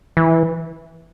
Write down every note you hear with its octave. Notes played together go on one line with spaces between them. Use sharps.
E3